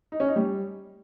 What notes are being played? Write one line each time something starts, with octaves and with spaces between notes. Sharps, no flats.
D#4
C#4
D#4
G3